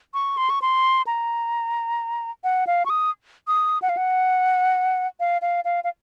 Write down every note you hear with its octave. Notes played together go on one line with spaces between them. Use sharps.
C#6
C6
C#6
C6
A#5
F#5
F5
C#6
D#6
D#6
F#5
F5
F#5
F5
F5
F5
F5